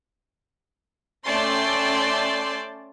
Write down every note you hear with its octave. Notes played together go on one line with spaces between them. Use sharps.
A3 C#4 D5 G5 A5 C6